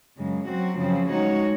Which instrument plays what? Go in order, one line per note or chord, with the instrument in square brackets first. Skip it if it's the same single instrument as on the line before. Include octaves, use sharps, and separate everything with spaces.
[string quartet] F#2 C#3 G#3
F#3 C4 F#4
F#2 C#3 F3 C4
G#3 D#4 F#4 C#5